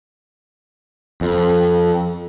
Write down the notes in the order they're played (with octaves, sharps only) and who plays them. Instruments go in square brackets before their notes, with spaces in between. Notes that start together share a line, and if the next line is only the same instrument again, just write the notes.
[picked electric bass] F2